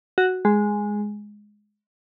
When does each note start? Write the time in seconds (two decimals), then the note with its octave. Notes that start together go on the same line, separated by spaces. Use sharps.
0.18 F#4
0.45 G#3